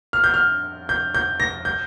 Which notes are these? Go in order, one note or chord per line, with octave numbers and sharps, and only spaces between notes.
F6
G6
F6
G6
G6
A#6
G6